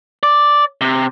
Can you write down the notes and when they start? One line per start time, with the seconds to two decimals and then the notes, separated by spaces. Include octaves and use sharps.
0.23 D5
0.81 C3